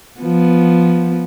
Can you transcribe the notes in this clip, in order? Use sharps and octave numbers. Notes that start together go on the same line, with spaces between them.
F3 B3